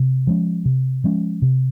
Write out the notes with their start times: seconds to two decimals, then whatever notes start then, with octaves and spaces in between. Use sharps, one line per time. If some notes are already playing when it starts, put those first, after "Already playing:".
Already playing: C3
0.27 F3 G#3 C#4
0.65 C3
1.04 F3 G#3 C#4
1.42 C3